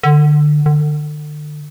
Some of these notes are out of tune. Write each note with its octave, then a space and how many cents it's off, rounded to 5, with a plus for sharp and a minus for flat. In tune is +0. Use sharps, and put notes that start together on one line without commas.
D3 +25
D3 +35